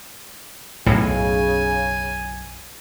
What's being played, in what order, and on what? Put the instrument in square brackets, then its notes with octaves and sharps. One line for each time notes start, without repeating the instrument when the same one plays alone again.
[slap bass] B1 F#2 [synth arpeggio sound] A2 [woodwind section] C#3 [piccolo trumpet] G#5